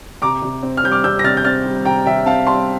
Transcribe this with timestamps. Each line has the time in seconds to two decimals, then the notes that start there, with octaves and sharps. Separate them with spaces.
0.22 C3 A#5 D6
0.42 C3
0.63 C4
0.77 F6
0.84 G3 G6
0.92 D6 F6
1.04 C3 E6 G6
1.19 A#6
1.24 C3 F6 A6
1.37 G6
1.44 C4 F6 A6
1.66 G3
1.85 C3 G5 A#5
2.06 C3 E5 G5
2.26 C4 F5 A5
2.47 G3 A5 C6